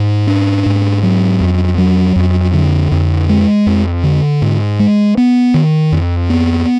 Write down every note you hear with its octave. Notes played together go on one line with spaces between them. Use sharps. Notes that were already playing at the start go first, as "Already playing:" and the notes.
Already playing: G#2
D4
G#2
F#3
F2
F#3
F2
D3
F2
G#3
F2
D3
G#2
G#3
B3
D#3
F2
B3